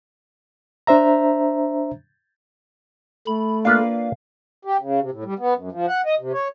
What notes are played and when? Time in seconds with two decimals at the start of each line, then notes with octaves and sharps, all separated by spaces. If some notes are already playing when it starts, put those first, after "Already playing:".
0.87 D4 C5 E5 A#5
3.27 A3 B5
3.65 A#3 D4 F4 B4 F5
4.65 G4
4.80 C#3
5.00 C3
5.11 A2
5.24 G3
5.39 B3
5.56 F#2
5.72 F3
5.88 F#5
6.06 D#5
6.20 C3
6.33 C#5